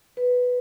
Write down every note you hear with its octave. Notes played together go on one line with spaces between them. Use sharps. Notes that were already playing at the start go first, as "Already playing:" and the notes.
B4